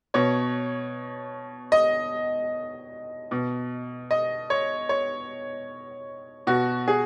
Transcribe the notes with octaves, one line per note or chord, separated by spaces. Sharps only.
B2 C#5
D#5
B2
D#5
C#5
C#5
B2 F#4
G#4